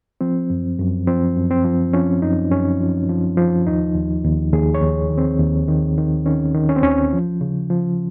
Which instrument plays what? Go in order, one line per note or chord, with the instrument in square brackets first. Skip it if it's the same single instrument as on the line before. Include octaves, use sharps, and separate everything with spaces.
[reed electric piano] F3 C4
F#2
F#2
F3 C4
F#2
C4
F3
F3 C#4
F#2 D#4
F#2 C#4
F3
F3
F3
D#2 D#4
D#2
D#2
D#2 G#4
C#5
D#2
D#3
C4
D#2
D#3
D#3
D#3 C#4
D#3
C#4
C4
D#2 C#4
F3
C#3
F3